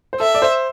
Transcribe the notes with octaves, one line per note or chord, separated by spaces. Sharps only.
C5
A4 E5
D5
C5